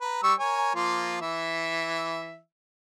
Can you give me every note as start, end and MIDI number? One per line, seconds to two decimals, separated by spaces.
0.01 0.22 71
0.01 0.22 82
0.23 0.34 55
0.23 0.34 85
0.23 0.34 88
0.39 0.72 70
0.39 0.72 73
0.39 0.72 80
0.75 1.17 53
0.75 1.17 58
0.75 1.17 65
1.21 2.38 52
1.21 2.38 76